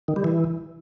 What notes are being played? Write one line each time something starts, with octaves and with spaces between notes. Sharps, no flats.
D#3
G3
E3